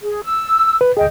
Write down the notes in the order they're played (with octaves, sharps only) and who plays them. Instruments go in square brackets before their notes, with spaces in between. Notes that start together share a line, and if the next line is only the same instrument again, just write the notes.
[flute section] G#4
E6
[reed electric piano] B4
[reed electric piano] D2 G#4 [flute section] D#5 G5